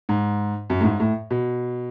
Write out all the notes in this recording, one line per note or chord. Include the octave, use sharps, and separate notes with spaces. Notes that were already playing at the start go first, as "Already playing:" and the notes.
G#2
F#2
A2
G#2
A2
B2